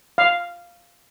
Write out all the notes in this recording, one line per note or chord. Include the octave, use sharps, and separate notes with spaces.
F5